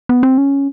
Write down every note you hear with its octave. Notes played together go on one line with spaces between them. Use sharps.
B3
C4
C#4